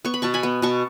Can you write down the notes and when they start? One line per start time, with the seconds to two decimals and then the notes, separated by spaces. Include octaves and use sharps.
0.05 B3 C#6
0.14 B5
0.22 B2 A5 C#6
0.34 G#5 B5
0.43 B3
0.62 B2 A5 C#6